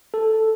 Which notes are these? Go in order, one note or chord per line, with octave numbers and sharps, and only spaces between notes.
A4